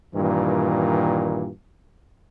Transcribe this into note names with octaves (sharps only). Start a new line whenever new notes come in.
G2 A#2 D#3 E3